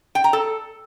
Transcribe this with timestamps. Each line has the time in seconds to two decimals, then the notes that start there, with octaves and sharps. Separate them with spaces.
0.15 G5
0.24 A#5
0.33 A4